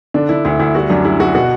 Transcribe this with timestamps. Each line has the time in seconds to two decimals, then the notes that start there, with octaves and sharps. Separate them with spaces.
0.14 D3 D4
0.29 D3 E4
0.45 D2 E4
0.59 D2 E4
0.75 G3 F#4
0.90 F#2 D4
1.04 G3 E4
1.20 G3 F#4
1.35 B2 F#4